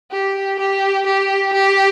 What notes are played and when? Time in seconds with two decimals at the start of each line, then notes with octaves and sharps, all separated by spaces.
0.11 G4
0.60 G4
1.06 G4
1.53 G4